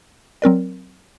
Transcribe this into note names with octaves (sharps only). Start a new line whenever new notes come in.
F#3 C4 A#4 D5